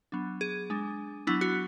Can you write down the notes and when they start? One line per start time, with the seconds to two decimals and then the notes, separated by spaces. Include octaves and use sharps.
0.12 F#3 B3 D4
0.41 G#4
0.70 G#3 D4
1.27 F#3 B3 D4 E4
1.41 F#4